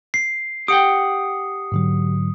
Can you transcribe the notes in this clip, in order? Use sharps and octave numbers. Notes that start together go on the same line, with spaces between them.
C7
G4 F#5 G5 D#6 C#7
G#2 D3 F#3